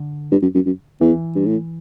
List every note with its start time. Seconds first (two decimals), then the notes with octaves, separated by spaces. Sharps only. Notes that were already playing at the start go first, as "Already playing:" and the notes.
Already playing: D3
0.32 G2
0.42 F#2
0.55 F#2
0.66 F#2
1.01 E2 E3
1.35 G2
1.46 A2